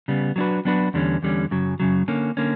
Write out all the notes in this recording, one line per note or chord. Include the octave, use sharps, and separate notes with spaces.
C#3 G3 B3
F#3 B3 D4 F#4 B4
F#3 B3 D4 F#4 B4
E2 D3 G3 C#4
E2 D3 G3 C#4
F#2 C#3 F#3
F#2 C#3 F#3
D3 A#3 C#4
D3 A#3 C#4